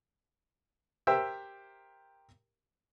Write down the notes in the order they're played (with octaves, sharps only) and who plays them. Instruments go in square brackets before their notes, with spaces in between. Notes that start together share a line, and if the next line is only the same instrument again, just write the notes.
[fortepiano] G4 A#4 C5 E5 G5 E6